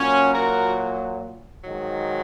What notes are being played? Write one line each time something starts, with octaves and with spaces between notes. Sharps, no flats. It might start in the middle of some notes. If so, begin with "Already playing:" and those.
Already playing: A#2 F#3 C#4
F#4 A#4
G#2 D#3 F#3